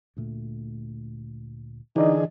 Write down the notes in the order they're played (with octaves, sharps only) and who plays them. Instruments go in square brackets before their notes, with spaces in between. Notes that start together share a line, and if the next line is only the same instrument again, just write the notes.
[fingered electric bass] D2 A#2 A3
[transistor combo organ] D3 G#4 [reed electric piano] E3 D5 D#5 [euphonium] D#4